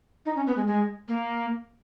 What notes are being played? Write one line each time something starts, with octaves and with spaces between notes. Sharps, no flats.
D#4
C#4
B3
G#3
G#3
A#3